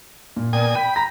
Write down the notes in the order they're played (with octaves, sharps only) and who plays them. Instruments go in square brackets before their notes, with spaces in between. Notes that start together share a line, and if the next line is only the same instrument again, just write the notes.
[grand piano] A#2
[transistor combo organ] A#2 G#5 D#6 [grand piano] B3 G5 [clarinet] D5
[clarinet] G5 [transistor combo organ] B5 [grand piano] G6 B6 D#7
[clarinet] A#5 [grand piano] A#6